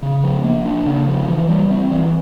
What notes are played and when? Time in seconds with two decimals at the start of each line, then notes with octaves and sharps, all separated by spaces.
0.02 C#3
0.23 F3
0.44 A#3
0.65 D4
0.86 C#3
1.07 F3
1.28 E3
1.49 G3
1.70 C4
1.91 E3